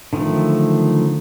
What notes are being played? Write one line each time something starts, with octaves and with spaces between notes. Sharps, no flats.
D3 D#3 F3 F#3 A3